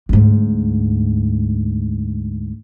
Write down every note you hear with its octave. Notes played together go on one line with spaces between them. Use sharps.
D2 G#2